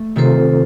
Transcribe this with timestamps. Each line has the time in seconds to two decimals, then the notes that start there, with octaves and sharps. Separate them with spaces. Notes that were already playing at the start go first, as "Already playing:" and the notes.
Already playing: A3
0.16 C3 D#3 C4 F4 A4 C5